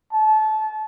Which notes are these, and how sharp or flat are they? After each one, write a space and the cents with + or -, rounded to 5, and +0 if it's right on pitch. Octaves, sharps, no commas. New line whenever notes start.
A5 -25